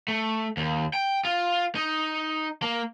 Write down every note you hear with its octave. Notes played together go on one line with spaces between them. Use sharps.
A3
D#2
G5
F4
D#4
A#3